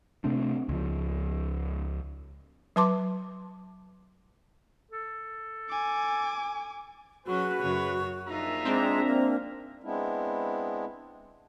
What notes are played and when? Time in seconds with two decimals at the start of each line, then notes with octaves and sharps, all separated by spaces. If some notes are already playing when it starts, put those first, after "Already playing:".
0.24 C3 A3 C4 D4
0.69 C#2 F3
2.76 F#3 B4 A5 C6 D6
4.91 A4
5.69 G#5 D6
7.26 F#3 C#4 F#4 G#4 B4
7.62 F#2 C#3 C#5
8.28 A#1 D#4 F4 E5 A#5
8.65 G#3 C4 D4
9.07 A#3
9.82 G#3 B3 C4 D4 E4